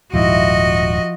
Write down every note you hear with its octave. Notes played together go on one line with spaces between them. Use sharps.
D#1 G#2 F3 E4 F#4 D#5